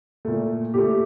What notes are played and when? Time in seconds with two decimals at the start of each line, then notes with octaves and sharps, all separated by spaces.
0.25 A#2 A3
0.74 A#2 A3 G4